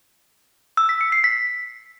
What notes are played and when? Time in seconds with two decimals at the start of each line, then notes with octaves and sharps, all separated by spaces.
0.77 E6
0.89 B6
1.01 C#7
1.12 C7
1.24 B6